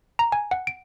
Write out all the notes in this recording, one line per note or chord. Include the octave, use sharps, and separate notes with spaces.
A#5
G#5
F#5
D7